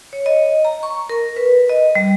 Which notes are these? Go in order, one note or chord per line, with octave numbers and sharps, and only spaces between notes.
C#5
D#5
A#5
C#6
A#4
B4
D#5
G3